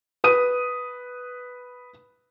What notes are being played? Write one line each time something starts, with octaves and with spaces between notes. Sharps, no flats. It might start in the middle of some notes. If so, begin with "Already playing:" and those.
B4 D#6 D#7